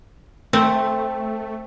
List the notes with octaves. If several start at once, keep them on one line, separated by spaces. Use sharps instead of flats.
A3 C4